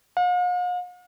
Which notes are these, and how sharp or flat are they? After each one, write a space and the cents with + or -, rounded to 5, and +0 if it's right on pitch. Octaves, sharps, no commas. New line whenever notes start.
F5 +45